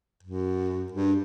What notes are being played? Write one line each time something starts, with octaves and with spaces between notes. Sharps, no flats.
F#2
G2